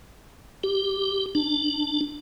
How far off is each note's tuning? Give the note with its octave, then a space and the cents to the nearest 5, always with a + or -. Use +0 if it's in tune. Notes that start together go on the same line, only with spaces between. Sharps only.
G4 +0
D4 +15